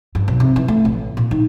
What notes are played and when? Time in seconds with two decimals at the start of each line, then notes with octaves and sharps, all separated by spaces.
0.15 G2
0.28 B1
0.40 C3
0.56 E3
0.68 A3
0.85 A1
1.17 A#2
1.31 D#3